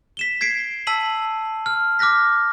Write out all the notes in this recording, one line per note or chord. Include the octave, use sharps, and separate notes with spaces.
B6 E7 G7
G#6 B6 C7 D7
A5 E6 B6 D#7 F#7
F6
D6 F6 F#6 A#6 B6